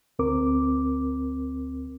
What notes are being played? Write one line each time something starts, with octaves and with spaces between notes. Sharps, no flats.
D2 C4 A#4 D6